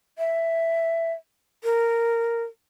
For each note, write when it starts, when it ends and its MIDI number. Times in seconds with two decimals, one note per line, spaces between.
0.18 1.13 76
1.64 2.43 70